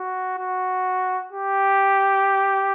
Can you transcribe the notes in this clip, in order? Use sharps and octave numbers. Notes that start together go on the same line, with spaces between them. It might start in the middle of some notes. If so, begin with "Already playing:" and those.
Already playing: F#4
F#4
G4